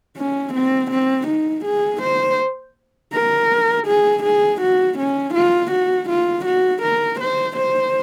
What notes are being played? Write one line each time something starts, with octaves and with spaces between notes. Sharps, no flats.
C#4
C4
C4
D#4
G#4
C5
A#4
G#4
G#4
F#4
C#4
F4
F#4
F4
F#4
A#4
C5
C5